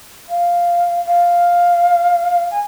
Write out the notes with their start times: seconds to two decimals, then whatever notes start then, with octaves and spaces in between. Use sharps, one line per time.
0.29 F5
1.06 F5
2.51 G#5